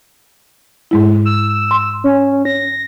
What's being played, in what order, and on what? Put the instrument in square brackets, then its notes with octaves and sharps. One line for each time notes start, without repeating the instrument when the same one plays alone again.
[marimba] G#2 G#3 E4
[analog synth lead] E6
[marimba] C6
[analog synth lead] C#4
A#6